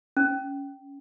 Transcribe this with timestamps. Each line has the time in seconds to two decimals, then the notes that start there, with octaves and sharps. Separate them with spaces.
0.17 C#4